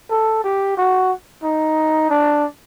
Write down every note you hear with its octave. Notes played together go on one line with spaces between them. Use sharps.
A4
G4
F#4
D#4
D4